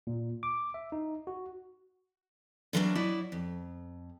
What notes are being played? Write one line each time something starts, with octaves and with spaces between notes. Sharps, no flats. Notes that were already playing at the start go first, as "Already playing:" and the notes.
A#2
D6
E5
D#4
F#4
D3 E3 F#3 G3 A#3 D4
F#3 E4 D5 D#5
F2